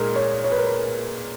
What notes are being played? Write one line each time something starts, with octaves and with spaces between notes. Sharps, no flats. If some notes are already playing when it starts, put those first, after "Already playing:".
Already playing: A#2 G#3 D#4 G#4 A#4
C#5
C#5
B4
A#4
B4